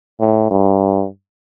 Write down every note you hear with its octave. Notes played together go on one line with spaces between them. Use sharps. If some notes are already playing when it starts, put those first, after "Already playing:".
A2
G2